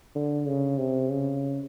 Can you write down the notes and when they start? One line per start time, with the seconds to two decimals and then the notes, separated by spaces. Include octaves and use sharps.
0.15 D3
0.47 C#3
0.78 C3
1.10 C#3